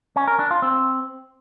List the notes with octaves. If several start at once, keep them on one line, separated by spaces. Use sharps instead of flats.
C#4
A#4
D4
F4
C4